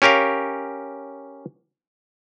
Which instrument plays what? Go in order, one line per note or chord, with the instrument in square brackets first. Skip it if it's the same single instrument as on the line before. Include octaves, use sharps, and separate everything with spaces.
[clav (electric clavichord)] C#4 G4 A#4 C#5 F5